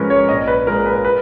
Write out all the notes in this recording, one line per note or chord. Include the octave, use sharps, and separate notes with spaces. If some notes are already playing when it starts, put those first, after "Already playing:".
Already playing: G#2 F3 G#3 C#4 A#4 B4
C#5
A#1 D#5
B4
A#2 G#3 A#4
B4
B4